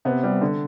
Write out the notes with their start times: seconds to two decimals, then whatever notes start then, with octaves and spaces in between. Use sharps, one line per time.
0.05 C3 B3
0.23 G3
0.42 D3